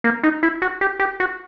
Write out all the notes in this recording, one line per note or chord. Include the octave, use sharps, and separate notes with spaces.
A#3
D#4
E4
F#4
G4
G4
F#4